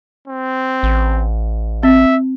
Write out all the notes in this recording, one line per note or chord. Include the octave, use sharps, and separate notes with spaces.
C4
A1
C4 E5